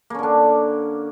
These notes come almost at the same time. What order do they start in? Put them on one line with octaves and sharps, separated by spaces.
A#3 C#4 D3 D4